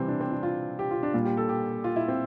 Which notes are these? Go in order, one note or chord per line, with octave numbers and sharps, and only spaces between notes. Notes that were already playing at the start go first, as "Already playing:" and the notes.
Already playing: C3 E3 G3 C4
D4
C4
D4
F4
G4
F4
D4
A#2 G3 F4
G4
A4
G4
F4
E4
C4